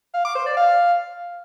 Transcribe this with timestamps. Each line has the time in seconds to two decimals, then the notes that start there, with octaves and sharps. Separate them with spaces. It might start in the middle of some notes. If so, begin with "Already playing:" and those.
0.14 F5
0.25 D6
0.35 C5
0.46 D5
0.57 F5